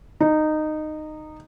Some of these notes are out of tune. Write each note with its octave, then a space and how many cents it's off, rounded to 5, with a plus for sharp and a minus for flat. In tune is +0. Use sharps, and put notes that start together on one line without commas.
D#4 -15